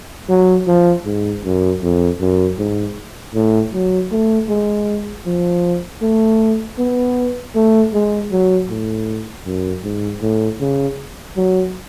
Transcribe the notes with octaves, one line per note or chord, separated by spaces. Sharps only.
F#3
F3
G#2
F#2
F2
F#2
G#2
A2
F#3
A3
G#3
F3
A3
B3
A3
G#3
F#3
A2
F#2
G#2
A2
C#3
F#3